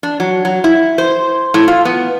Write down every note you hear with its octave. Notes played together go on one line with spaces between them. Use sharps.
D4
F#3
F#3
E4
C5
A2
F4
B3